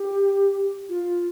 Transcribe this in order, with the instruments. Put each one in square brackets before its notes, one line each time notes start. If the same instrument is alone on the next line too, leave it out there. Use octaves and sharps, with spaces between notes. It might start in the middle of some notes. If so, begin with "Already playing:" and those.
Already playing: [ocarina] G4
F4